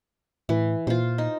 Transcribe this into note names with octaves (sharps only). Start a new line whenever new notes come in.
A2 E3
A#2 F4 C5
D#4